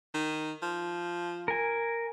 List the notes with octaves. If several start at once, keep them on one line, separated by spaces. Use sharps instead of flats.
D#3
F3
A#4 G#5